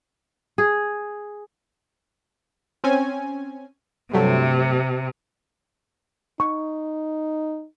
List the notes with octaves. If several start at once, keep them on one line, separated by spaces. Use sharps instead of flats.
G#4
C4 C#4 G#5
G2 C3 F#3 A3
D#4 C#6